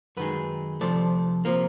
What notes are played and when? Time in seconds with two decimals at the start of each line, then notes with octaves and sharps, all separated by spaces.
0.17 F#2 D#3 G#3 B4
0.81 F2 C3 F3 A3 D5
1.45 C3 F3 A#3